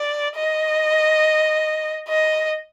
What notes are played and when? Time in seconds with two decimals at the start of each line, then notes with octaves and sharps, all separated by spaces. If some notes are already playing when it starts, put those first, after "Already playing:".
Already playing: D5
0.36 D#5
2.09 D#5